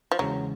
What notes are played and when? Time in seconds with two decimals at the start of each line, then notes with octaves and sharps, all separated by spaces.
0.12 F3
0.19 E2 C#3 E3 F#3 G#3 C#4